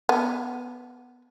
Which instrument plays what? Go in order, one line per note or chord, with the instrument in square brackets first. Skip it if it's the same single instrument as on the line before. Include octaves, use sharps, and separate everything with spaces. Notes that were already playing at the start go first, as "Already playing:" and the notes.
[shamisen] B3